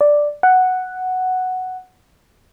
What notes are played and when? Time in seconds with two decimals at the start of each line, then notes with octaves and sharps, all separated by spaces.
0.01 D5
0.43 F#5